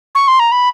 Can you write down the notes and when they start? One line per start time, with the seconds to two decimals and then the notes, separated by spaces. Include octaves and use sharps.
0.15 C#6
0.27 C6
0.39 A#5
0.52 B5